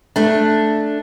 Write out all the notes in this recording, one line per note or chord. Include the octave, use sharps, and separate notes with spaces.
A3 D4